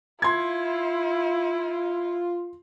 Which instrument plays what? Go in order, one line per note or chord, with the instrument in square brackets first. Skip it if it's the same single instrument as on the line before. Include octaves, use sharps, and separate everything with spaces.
[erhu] E4 [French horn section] F4 [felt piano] C6 G#6